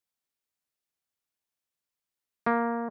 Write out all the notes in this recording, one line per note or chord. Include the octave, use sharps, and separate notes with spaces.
A#3